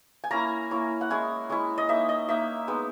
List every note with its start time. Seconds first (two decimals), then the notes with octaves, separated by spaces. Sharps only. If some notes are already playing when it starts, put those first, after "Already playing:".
0.24 G#5
0.31 A#3 C#4 E4 A#5
0.71 A#3 C#4 E4
1.01 F#5
1.10 G#3 C#4 E4 G#5
1.50 G#3 C#4 E4
1.78 D#5
1.89 A#3 D#4 E5
2.09 D#5
2.28 A#3 D#4 E5
2.68 G#3 B3 D#4